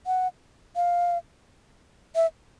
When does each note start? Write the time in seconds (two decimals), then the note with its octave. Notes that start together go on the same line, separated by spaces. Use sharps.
0.07 F#5
0.76 F5
2.15 E5